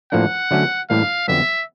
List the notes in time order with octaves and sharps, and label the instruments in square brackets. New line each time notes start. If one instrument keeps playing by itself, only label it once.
[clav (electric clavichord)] A2 F3 A#3 D4 [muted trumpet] F#5
[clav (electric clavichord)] D3 F#3 A3 C#4 F#4
[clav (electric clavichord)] A2 E3 G3 A#3 [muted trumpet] F5
[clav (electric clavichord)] F2 D3 F#3 B3 [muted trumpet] E5